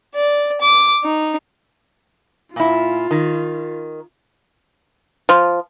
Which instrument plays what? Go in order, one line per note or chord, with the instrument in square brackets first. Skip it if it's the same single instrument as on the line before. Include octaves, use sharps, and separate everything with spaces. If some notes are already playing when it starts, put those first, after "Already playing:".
[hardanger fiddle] D5
D6
D#4
[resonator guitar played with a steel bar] A#2 E4 [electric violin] F4
[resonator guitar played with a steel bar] D#3
[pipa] F3